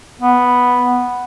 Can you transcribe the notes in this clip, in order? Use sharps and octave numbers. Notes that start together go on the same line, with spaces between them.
B3